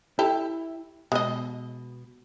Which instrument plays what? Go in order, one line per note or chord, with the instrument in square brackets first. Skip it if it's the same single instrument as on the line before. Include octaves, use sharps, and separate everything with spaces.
[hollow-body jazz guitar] E4 [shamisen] G4 A4
[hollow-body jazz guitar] B2 [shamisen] G#3 D#5